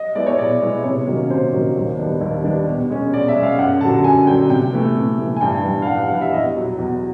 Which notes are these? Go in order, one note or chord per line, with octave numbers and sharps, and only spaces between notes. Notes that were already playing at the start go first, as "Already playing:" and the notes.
Already playing: D#5
G#3 B3 E4 D5
C#5
B2 D5
G#3 B3 E4
C3 C#5
D#3 F#3 A#3 C#4
C3 C5
D#3 F#3 A#3 C#4
D#2
D#3 G3 B3 D4
D#2
D#3 G3 B3 D4
B2
G#3 C#4
B2 D5
E5
G#3 C#4
F5
F#2 F#5
D3 F#3 A5
F#2 G#5
D3 F#3 G5
C3 G5
E3 A3
C3
E3 A3
G#5
G2 G5
E3 G3
F5
G2 F#5
F#5
E3 G3 F5
E5
E2 D#5
B2 F#3
E2